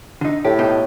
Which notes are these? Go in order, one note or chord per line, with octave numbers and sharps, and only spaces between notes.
D3 D#4
A2 G4
B2 D#4 G4